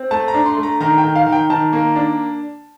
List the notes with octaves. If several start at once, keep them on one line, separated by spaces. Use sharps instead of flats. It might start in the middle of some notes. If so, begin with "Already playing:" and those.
Already playing: C4
A3 A5
A#5
D4
C6
A3
A#5
D#3 A#5
G5
D#3
F5
D#3
G5
D#3 A5
A#3
D4